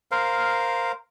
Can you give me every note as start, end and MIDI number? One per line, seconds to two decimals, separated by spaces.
0.11 0.92 70
0.11 0.92 72
0.11 0.92 77